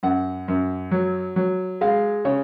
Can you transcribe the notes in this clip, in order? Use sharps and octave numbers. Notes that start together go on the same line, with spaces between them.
F#2 F#5
F#2
F#3
F#3
G#3 F5
C#3 C#5